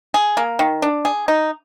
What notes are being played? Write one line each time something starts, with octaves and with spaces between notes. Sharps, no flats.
G#4
A#3
D#3
D4
G#4
D#4